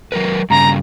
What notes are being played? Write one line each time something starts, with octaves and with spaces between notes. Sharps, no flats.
F#3 A#4 B4
G2 C#3 A#5